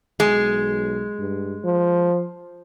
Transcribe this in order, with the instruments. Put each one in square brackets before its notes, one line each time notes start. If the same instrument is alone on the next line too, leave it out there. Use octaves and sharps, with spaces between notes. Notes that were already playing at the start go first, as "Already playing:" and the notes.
[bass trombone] B1 [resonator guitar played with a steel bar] G#3
[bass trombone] G2
F3